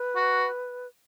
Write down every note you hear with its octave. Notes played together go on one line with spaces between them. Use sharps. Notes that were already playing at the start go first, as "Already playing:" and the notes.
Already playing: B4
F#4